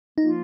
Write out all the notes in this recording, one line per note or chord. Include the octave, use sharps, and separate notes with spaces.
F3 A#3 D#4 F4